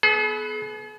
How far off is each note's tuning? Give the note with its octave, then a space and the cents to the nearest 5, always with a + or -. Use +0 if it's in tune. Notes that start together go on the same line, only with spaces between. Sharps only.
B3 +0 G#4 +45